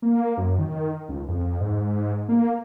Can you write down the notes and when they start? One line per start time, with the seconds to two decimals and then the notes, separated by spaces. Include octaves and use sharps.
0.02 A#3
0.37 F#2
0.59 D#3
1.09 C#2
1.28 F2
1.60 G#2
2.29 A#3